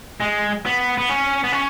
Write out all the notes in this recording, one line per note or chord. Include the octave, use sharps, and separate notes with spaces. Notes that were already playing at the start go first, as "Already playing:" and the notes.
G#3
B3
B3
C#4
B3
C#4